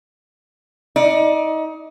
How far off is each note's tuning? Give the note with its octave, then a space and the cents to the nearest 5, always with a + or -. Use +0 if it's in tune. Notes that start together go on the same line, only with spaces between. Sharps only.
D#4 +30 D5 +30